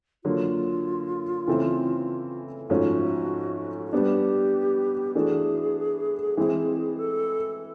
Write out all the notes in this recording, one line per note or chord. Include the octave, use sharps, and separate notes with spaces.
D3 F#3 A#3 F4
C#3 E3 A3 C4 E4
G#2 F3 A3 C#4 F#4
F#4
G3 B3 D4 G4
E3 A3 D4 F#4 G#4
E3 G#3 C4 E4
A4